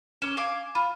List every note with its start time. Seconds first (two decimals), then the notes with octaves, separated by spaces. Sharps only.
0.22 C#4 D6 E7
0.37 F5 G#5 D6
0.75 F4 B5